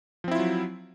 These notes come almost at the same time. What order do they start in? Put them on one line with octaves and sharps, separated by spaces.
F3 C4 E4 F4 F#3